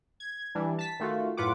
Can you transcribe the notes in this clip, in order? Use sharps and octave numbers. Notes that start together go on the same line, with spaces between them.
G#6
E3 G3 D4
A5 B6
D#3 A3 F4 F#4
F#2 A2 F4 B4 F#5 D6